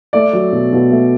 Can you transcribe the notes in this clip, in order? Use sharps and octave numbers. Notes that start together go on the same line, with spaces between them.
A3 D5
F#3
B2
B2
A3